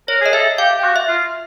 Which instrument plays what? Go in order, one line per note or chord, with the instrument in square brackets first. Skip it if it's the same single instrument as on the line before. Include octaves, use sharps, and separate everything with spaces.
[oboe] A#4 [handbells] C#5
[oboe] G#4 [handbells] D#5
[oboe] A4 [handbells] E5
[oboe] G4 [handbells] F5
[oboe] G4
F#4
[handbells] E5
[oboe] F4